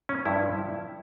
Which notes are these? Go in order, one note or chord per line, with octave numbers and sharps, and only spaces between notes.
C#4
G2 F3 E4
E4